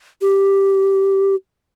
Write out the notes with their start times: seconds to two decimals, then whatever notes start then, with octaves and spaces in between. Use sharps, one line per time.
0.22 G4